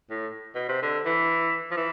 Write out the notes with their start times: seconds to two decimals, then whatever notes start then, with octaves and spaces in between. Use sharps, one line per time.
0.10 A2
0.55 B2
0.68 C3
0.82 D3
1.05 E3
1.71 F3
1.77 E3